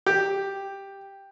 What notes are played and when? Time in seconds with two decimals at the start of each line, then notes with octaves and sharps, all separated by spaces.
0.06 G4